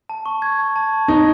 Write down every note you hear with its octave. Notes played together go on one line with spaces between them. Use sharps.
A5
C#6
G#6
A5
A5
C#6
D#4 G#6